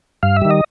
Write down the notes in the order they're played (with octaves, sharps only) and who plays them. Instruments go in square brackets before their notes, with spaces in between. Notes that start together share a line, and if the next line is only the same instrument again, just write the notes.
[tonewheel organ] G2 F5
E5
D#3 G3
D#5